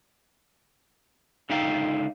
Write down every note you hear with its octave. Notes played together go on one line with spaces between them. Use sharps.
C#2 D3 D#4 E5 F5 G5